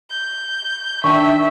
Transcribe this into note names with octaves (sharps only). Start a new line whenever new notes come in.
G6
D#3 D4 E5 G5 C#6